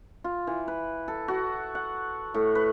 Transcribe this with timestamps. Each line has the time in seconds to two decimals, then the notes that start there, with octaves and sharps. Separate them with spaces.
0.24 F4
0.47 E3
0.68 B4
1.08 A4
1.28 F#4
1.75 F#5
2.34 A2
2.55 B4